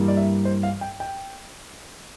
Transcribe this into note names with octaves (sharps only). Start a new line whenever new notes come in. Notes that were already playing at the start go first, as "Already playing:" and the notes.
Already playing: G2 E3 G3 A#3
D5
E5
C5
F5
G5
G5